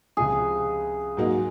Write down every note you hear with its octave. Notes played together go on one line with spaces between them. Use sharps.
C#2 C3 F3 G#3 G#4
G#2 F#3 A#3 D#4 F#4